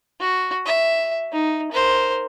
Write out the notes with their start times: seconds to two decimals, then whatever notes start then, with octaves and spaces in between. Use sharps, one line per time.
0.21 F#4
0.66 E5
1.32 D#4
1.72 A#4 C5